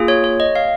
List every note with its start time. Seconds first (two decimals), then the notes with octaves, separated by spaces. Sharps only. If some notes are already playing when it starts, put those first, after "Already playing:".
Already playing: A#3 F4 G#4
0.08 C#5
0.24 C#5
0.40 D#5
0.55 F5